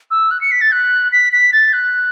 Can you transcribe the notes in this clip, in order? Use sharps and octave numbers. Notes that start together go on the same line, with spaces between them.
E6
F#6
C#7
B6
A6
F#6
B6
B6
A6
F#6